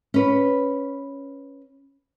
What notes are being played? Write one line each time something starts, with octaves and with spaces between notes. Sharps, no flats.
C#4 B4